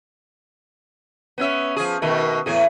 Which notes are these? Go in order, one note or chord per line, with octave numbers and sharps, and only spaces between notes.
B3 C#4 E5
F3 G#4
B2 D#3 A3
E2 A2 G#4